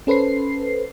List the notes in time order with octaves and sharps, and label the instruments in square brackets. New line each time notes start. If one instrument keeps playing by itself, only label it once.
[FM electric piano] C#4 A4 B4 C5 C7